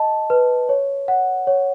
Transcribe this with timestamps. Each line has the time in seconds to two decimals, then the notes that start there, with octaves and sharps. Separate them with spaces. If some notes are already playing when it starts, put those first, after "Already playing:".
Already playing: D#5 A5
0.30 B4
0.69 C#5
1.08 F#5
1.47 C#5